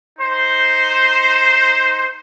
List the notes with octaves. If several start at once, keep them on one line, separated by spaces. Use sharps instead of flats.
D#4 C5